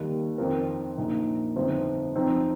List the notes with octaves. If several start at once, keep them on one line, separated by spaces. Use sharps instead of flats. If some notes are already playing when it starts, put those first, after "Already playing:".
Already playing: D#2 D#3 G3
F2 D#3 C4 F4 A#4
A#1 A#2 F3 D#4
G1 F2 F3 D#4 C5
F2 F3 C4 D#4